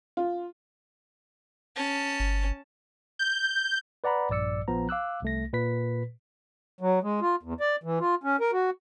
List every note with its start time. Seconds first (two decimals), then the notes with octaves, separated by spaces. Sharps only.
0.17 F4
1.77 C#4 A5
2.20 G1
3.19 G6
4.04 B4 D5 F#5 A#5 B5
4.30 A#1 G2 D5 E6 C#7
4.68 A#1 F3 B3 A#5
4.89 F5 D6 E6 F#6
5.22 C2 A3 A#6
5.53 A#2 B4 B6
6.80 F#3
7.03 G#3
7.21 F4
7.43 E2
7.60 D5
7.83 E3
8.00 F4
8.23 C#4
8.40 A#4
8.53 F#4